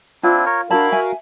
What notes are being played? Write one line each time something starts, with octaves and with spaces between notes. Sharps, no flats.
C4 D4 E4 F4
A#4 C#5
D4 E4 F#4 G#4 A#4 F5 A5 B5
E5 G#5